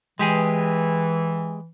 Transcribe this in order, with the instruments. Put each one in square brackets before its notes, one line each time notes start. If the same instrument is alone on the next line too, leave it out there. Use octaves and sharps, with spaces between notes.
[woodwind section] E3 [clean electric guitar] G#3 G4 G#4